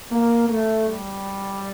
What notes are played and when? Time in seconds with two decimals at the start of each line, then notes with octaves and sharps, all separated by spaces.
0.12 A#3
0.50 A3
0.87 G3